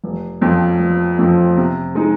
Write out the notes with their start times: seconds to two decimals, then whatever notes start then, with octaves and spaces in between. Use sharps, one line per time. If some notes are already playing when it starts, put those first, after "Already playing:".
0.04 F1
0.41 F2 F3 C4
0.80 F1
1.18 F2 F3 C4
1.57 C3
1.95 G#3 D#4